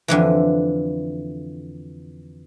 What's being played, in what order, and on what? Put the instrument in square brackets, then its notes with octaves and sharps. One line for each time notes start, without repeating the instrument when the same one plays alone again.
[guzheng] F2 D3 E3